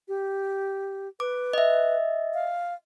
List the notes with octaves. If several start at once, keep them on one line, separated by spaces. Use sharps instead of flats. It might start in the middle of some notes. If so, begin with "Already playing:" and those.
G4
B4 D6
D#5 E5
F5